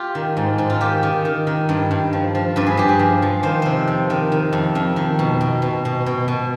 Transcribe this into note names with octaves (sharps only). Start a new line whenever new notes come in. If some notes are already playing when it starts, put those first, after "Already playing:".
Already playing: F4 G4
D#3
G#2
G#2
F4
D#3 G4
D#3
D#3
D#3
G2
G2
F3
F3
G2 B4
G#4
G2 G4
G#4
F3
F3
D#3 C5
C3 C5
F2
D#3
D#3
F2
F2
D#3
B2
B2
B2
B2
B2
B2